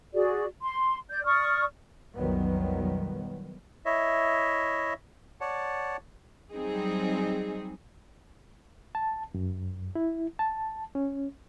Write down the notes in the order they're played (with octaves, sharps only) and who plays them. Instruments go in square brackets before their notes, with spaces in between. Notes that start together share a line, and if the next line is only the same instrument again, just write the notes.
[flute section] F#4 G#4 D5
C6
D5 G6
D5 C#6 D#6 F6
[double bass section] B1 F2 D#3 F#3 G3 B3
[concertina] E4 C#5 D#5 E5
C#5 D5 F#5 A5
[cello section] F#3 G3 C4 D#4 G#4
[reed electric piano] A5
F#2
E4
A5
C#4